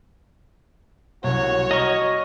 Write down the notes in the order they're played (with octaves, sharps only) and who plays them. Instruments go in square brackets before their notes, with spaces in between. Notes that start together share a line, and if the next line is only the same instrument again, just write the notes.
[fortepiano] C2 F#2 [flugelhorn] F#4 [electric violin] C#5
[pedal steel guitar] D#5 C#6 [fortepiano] A#5 F6